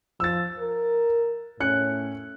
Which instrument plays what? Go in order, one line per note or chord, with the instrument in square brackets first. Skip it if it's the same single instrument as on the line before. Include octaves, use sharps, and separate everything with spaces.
[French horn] F3 [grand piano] E6 A6
[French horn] A#4
[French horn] A2 [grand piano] C#4 F#6 C#7